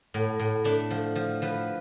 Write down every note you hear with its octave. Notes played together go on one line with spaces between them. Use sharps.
A2
A2
A3 D4
F3
F3
F3 B4